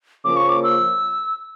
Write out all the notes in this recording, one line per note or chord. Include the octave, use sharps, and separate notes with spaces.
C#3 F3 A#3 C#4 D6
C#6
D6
E6